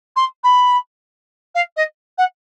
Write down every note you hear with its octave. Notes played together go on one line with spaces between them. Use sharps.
C6
B5
F5
D#5
F#5